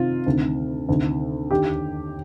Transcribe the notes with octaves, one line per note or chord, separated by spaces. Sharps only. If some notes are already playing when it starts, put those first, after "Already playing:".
Already playing: C3 D#3 F4
D2 C3 D#3
D2 C3 D#3
D#2 D3 G4